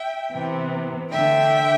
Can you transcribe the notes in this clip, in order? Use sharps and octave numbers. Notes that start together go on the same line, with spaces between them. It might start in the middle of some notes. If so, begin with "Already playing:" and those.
Already playing: E5 G5
C3 E3 B3
D3 A3 E5 G5